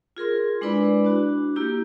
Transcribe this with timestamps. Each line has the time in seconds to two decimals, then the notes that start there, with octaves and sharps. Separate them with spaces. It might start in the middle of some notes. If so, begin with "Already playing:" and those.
0.17 F4 G#4 A#4 C6
0.61 G#3 D4 E4 B4 D5 B5
1.05 D4 F#4
1.56 A#3 E4 G4